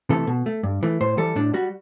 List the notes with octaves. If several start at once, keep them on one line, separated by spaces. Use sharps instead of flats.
C3 E3 A3 A4
B2
A3
G2
E3 A3
A2 C5
E3 G3 A4
A2 D4
G3 F#4